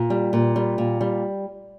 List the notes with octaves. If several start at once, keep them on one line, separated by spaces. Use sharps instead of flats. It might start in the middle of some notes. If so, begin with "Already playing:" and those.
Already playing: A#2
G3
A#2
G3
A#2
G3